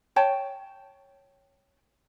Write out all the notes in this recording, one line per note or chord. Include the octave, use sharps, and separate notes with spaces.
C#5 G5 A5